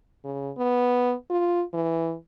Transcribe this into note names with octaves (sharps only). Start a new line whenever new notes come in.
C#3
B3
F4
E3